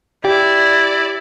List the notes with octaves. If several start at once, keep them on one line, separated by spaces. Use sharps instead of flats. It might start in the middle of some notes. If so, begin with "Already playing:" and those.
E4 G4 D5